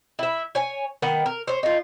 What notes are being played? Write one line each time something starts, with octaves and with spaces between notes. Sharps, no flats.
E4 E5
C#5 G#5
D#3 B3 F#5
A#4
C5 C#5
D#4 F4